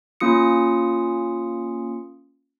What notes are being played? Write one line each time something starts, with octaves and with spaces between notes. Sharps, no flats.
A#3 C#4 F4 D#6 C#7